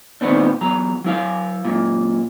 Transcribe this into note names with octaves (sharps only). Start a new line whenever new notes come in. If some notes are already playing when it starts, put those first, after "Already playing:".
A#2 D#3 A3 B3 C4 D4
E2 F#3 A#5
F#3 E4 F5
F#2 A#2